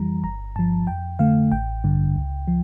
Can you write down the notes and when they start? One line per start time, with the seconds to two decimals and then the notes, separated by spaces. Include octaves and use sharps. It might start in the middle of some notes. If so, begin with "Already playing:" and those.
Already playing: F2 E3 G3 A#5
0.23 G1 A#5
0.56 G2 F3 A5
0.87 F2 G5
1.19 D3 A3 F5
1.52 A1 G5
1.84 G2 D3
2.16 C#2
2.48 F3